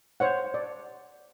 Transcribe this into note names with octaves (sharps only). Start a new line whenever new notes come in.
C5 C#5 F#5
D5